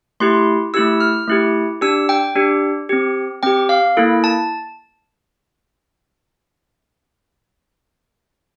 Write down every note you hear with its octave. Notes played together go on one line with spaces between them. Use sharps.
A3 E4 G4 C6
A3 E4 G4 E6
F6
A3 E4 G4
D4 G4 E6
G5
D4 G4
C4 G4
C4 G4 G5
F5
A#3 E4 A4
A5